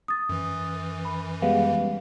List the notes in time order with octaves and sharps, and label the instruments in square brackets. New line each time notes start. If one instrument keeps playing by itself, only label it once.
[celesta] D#6 A6
[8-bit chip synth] F#2 E3
[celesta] B5
[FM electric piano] G3 G#3 B3 [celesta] F5